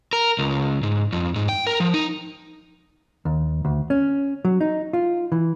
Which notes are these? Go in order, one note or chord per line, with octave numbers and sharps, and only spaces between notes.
A#4
C#2
G#2
F2
G#2
G5
A#4
F3
D#4
D#2
D2
C#4
F#3
D#4
F4
E3